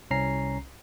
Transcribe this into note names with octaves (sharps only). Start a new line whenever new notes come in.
C2 C#4 A#5 C7